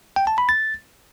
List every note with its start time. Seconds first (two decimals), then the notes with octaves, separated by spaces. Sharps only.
0.16 G5
0.27 A5
0.38 B5
0.49 A6